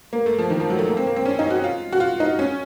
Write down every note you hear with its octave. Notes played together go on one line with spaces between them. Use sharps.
A#3
A3
F3
D#3
F3
F#3
A3
A#3
C4
A#3
C4
C#4
D#4
F#4
F4
F#4
F4
D#4
C#4